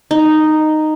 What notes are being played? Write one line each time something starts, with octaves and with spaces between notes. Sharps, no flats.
D#4